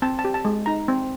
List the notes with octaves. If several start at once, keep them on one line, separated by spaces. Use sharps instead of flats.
C4 A5
A5
G4
A5
G#3
D#4 A#5
C4